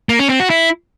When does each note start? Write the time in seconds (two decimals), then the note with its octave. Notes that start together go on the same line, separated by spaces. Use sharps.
0.09 A#3
0.19 C#4
0.30 C4
0.40 F#4
0.50 E4